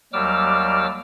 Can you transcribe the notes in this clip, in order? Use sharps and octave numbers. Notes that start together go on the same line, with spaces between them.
D#2 F#3 G3 D6 E6 F6